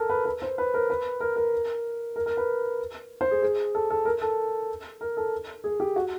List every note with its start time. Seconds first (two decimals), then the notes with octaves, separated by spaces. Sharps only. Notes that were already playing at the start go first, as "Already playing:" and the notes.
Already playing: A4 A#4
0.09 B4
0.25 B4
0.42 C5
0.58 B4
0.74 A#4
0.90 B4
1.20 A#4
1.36 A#4
2.16 A#4
2.26 A#4
2.37 B4
3.21 C5
3.31 G#4
3.42 G#4
3.75 A4
3.90 A4
4.05 A#4
4.21 A4
5.01 A#4
5.17 A4
5.64 G#4
5.80 G4
5.96 F#4